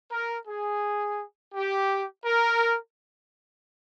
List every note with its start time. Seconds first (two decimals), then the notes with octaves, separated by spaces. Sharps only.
0.12 A#4
0.48 G#4
1.55 G4
2.25 A#4